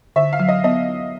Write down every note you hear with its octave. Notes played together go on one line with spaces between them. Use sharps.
D3 E5
F5
F#3
D#5
B3 D#5